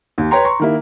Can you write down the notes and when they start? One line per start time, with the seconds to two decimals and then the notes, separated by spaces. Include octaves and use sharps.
0.18 D#2
0.31 B4 C#5 G5 A#5 C6
0.45 A#5 C6 C#6
0.60 D#3 A#3 E4